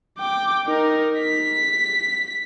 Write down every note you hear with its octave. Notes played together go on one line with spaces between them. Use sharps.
G5 D6
D#4 A#4
B6